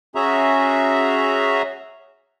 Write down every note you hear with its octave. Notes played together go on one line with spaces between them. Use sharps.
C#4 F#4 G#4 E5 A#5